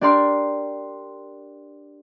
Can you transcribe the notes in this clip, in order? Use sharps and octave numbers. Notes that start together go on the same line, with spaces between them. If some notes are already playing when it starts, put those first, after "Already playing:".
D4 G4 A#4 D5 C6